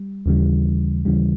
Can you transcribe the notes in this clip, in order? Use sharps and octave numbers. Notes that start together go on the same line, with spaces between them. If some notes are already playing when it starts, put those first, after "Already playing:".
Already playing: G3
D#2 C#3 E3 G3
D#2 C#3 E3 G3